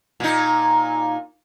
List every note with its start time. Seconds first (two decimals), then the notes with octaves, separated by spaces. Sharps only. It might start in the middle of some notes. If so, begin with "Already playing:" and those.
0.20 A#2 D#4